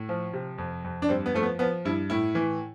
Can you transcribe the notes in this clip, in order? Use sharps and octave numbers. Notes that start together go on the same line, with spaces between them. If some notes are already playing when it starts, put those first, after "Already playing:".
Already playing: A2
F3
C3
F2
F2
D4
G2 C4
B3
F3 A3
B3
F3 B3
G2 E4
A2 E4
E3